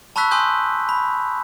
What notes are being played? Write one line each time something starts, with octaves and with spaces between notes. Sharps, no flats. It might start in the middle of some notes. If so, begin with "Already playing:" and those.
A5 B5 C#6 E6 F#6 B6
G#5 C6 D#6 F#6 G6
B5